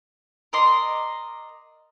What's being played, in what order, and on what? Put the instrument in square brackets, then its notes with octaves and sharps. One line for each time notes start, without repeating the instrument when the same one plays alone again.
[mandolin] A#4 D5 D#5 C6